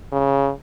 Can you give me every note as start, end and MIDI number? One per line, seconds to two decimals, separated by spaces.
0.12 0.50 49